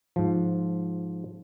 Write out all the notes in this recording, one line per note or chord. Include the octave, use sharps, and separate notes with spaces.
G#2 F3